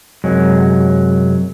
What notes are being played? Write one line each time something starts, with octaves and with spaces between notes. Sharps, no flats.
F#2 C3 F#3 G#3